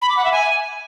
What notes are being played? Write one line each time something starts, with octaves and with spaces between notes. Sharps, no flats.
B5
D6
F#5
E5
G#5